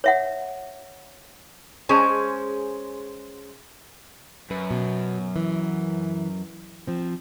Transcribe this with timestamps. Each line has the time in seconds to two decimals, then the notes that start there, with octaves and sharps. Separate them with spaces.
0.04 C#5 E5 F#5
1.89 G#3 C#4 G#4 C5
4.51 F#2 B4
4.71 B2
5.36 E3
6.87 F3 C4